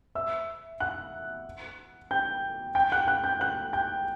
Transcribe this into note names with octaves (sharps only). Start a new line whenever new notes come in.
E5 E6
F#5 F#6
G5 G6
G5 G6
F#5 F#6
F#5 F#6
G5 G6
F#5 F#6
G5 G6